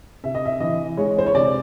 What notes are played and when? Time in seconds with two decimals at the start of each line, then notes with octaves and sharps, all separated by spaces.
0.24 C3 E5
0.35 D#5
0.45 E5
0.60 E3 D#5
0.97 G#3 C#5
1.18 C5
1.27 C#5
1.34 C3 D5